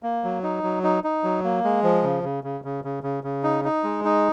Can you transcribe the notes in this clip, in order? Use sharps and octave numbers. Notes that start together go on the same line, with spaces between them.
A#3
F#3
D#4
F#3
D#4
D#4
F#3
A#3
G#3
F3
C#3
C#3
C#3
C#3
C#3
C#3
C#3
D#4
D#4
G#3
D#4